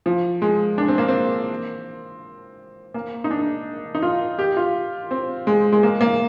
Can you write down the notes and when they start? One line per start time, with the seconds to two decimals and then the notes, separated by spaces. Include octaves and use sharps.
0.06 F3
0.42 G#3
0.78 D4
0.88 C4
0.98 A#3
1.08 C4
2.94 A#3
3.24 D#4
3.31 D4
3.95 D#4
4.02 F4
4.39 G4
4.57 F4
5.11 C4
5.47 G#3
5.72 G#3
5.83 A#3
6.01 A#3